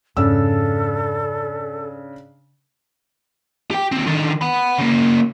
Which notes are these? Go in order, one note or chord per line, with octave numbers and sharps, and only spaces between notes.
F2 G#2 C#3 C#4 D4 A4 E6
G4 G5
D#2 C4
D3 D#3
F#5 B5
C#3 A#3